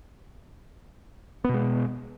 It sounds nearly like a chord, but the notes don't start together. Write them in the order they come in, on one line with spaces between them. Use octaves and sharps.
B3 B2 G#3